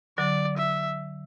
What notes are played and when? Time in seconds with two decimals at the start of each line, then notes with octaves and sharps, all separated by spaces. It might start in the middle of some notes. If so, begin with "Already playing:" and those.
0.18 D3 F#3 D5
0.58 E5